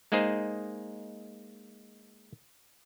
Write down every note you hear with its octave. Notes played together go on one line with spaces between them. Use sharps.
G#3 A#3 D#4 G#4 C5